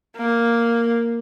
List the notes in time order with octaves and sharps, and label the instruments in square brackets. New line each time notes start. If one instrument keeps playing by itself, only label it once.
[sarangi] A#3